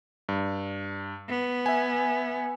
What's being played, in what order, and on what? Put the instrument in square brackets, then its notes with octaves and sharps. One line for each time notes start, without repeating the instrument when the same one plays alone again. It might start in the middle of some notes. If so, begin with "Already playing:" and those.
[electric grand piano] G2
[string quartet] B3
[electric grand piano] E5 G#5